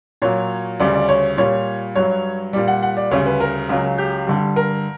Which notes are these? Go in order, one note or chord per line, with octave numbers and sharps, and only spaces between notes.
A#2 F#3 C#5
D2 C#3 G3 D5
D5
C#5
A#2 G3 C#5
G2 F#3 C#5
A#2 G3 D5
F#5
F#5
D5
D2 C#3 G3 C#5
B4
A#4
C#2 C#3 F#3
G4
G2 D3 G3
A#4